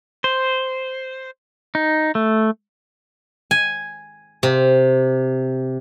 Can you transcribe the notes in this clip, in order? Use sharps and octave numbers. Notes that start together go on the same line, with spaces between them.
C5
D#4
A3
G#5
C3